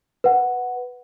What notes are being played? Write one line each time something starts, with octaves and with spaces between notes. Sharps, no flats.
B4 F#5